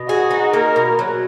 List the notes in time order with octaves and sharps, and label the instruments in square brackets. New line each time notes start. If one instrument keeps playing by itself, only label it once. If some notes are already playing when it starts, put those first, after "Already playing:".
Already playing: [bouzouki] B2
[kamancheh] F#4 [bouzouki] G#4
[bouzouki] D#4
[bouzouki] A#3 [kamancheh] A#4
[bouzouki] B2
F#3